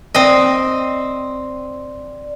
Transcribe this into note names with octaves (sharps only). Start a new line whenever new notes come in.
C4 D5 D#5